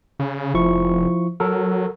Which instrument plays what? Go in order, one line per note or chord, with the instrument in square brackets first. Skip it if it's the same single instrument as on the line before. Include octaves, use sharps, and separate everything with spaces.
[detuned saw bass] C#3
[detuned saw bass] F1 [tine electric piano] F3 E4 C#6
[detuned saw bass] F#3 [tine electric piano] A4 A#4